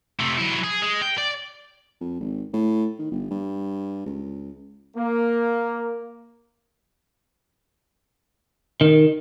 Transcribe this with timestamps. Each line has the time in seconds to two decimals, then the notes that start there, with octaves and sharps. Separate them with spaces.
0.19 C3 A3
0.37 F#3 E4
0.63 G#4
0.82 G#3
1.02 G5
1.18 D5
2.01 F2
2.20 G#1
2.53 A2
2.99 D#3
3.11 G1
3.31 G2
4.06 C#2
4.97 A#3
8.81 D#3